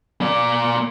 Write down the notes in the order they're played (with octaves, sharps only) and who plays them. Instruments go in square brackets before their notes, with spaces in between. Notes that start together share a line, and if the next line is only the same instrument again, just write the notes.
[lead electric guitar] A#3 D5